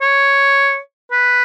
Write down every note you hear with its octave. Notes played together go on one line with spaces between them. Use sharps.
C#5
B4